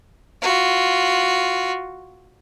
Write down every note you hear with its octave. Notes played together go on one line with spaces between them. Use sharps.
F4 F#4